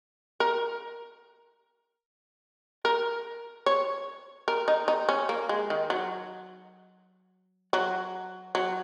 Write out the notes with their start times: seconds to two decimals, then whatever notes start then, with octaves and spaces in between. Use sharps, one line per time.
0.40 A#4
2.85 A#4
3.66 C#5
4.48 A#4
4.68 D#4
4.88 D#4
5.09 C#4
5.29 A#3
5.49 G#3
5.70 D#3
5.90 F#3
7.73 F#3
8.55 F#3